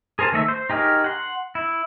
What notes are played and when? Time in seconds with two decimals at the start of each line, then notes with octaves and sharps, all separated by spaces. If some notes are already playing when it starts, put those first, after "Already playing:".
0.19 G#4 A#4 C5 G#5 A5
0.32 D#3 A3 D#5 E5
0.48 C5
0.70 D#4 G4 G#4 A#4 C#5
1.04 F#5 C6
1.55 E4